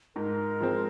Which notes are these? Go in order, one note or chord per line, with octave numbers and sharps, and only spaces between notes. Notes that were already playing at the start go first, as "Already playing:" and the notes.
G#2 A#4
F3 G#3 C4